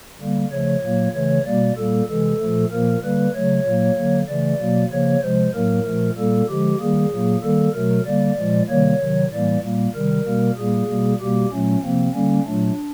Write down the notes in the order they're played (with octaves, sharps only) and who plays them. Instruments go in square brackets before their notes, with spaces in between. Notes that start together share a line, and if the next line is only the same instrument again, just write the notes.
[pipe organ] D3 G3 A#3
C#3 F3 A3 C#5
A#2 F#3 A#3
C#3 E3 A3 C#5
B2 G3 A#3 D5
A#2 G3 A#3 A4
C3 E3 G#3 A4
A#2 F3 A3
A#2 F3 A#3 A#4
D3 G3 A#3 B4
C#3 F#3 A3 C#5
A#2 F#3 A#3
D3 F#3 A#3
C#3 E3 A3 D5
B2 F#3 A#3
C#3 F3 A#3 C#5
C3 F3 G#3 C5
A2 F#3 A#3 A#4
A#2 F3 A3
A#2 G3 A#3 A4
D3 F3 G#3 G4
D#3 G3 A#3 G#4
A#2 F#3 A#3
D#3 G3 A#3 A4
B2 F#3 A3 A#4
D3 G3 A#3 D5
A#2 F3 G#3
C3 D#3 G3 A#3 C#5
C3 D#3 F#3
A2 E3 G3 A#3 D5
A#2 G3 A#3
C3 D#3 G3 A#4
B2 G3 A#3
A#2 G3 A#3 G#4
B2 G3 A#3
B2 G3 A#3 G4
A#2 F#3 A3 C#4
C3 F3 A#3 C4
D3 G3 A#3 C#4
A#2 F#3 A3 D4